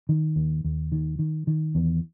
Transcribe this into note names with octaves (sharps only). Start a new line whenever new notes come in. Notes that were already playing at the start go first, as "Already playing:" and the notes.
D#3
D#2
D#2
D#3
D#3
D#3
E2